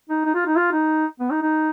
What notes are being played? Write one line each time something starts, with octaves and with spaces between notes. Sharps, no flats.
D#4
D#4
F4
D#4
F4
D#4
B3
D#4
D#4